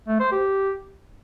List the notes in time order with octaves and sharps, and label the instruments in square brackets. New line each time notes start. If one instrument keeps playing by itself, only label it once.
[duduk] A3
C5
G4